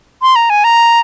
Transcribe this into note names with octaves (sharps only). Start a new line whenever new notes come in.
C6
A#5
G#5
A#5